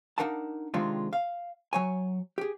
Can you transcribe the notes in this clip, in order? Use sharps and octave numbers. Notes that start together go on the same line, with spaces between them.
D4 D#4 A#4 F5 F#5 A5
C3 D#3 G#3 C4 D4 F4
F5
F#3 C#5 G#5
G4 G#4